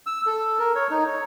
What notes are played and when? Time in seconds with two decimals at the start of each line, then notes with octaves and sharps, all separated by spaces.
0.07 E6
0.26 A4
0.59 A#4
0.75 C#5
0.90 D#4
1.07 C#5